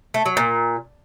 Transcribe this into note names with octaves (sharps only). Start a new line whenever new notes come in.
A3
F#3
A#2